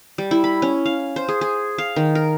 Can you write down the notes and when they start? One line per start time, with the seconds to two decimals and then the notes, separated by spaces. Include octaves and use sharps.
0.18 G3
0.31 E4
0.44 B5
0.62 C#4
0.86 F5
1.16 C5
1.29 G#4
1.41 G#4
1.78 F5
1.96 D#3
2.15 A#4